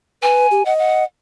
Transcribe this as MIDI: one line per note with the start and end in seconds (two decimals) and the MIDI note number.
0.22 0.47 71
0.22 0.63 80
0.51 0.65 67
0.65 1.04 75
0.65 0.74 78
0.79 1.03 78